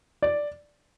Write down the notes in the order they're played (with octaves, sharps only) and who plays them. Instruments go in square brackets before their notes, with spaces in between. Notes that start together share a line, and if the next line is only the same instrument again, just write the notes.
[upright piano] D5